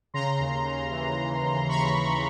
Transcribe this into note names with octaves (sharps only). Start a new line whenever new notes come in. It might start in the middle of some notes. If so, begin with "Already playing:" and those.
C#3 A#5 C6
D#2
C#3
E3
D#2
D#2
D#2 B5 C#6
D#2